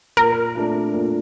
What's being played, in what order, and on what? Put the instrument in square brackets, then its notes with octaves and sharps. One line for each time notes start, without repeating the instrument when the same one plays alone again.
[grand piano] A#2 [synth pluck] A#4
[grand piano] A3 D4 F4
A#2